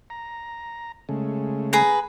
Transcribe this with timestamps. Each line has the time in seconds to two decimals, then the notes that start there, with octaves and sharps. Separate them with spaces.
0.10 A#5
1.09 C#3 G#3 A3
1.73 G#4 B4 A#5